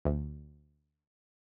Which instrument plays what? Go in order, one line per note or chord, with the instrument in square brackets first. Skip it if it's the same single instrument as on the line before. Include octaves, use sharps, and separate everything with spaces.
[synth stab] D2